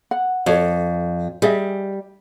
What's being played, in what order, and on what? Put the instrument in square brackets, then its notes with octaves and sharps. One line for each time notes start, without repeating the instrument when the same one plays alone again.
[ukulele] F#5
[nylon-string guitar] F2 [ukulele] A4 C#5
[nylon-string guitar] G3 [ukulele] G#4 D#5 E5